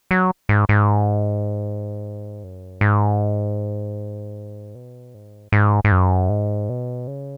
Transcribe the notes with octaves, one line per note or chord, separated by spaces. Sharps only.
F#3
G#2
G#2
F#2
G#2
B2
G#2
G#2
G#2
F#2
G#2
B2
C#3